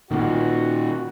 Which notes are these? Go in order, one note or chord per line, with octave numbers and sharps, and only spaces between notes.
A#2 D#3 F#4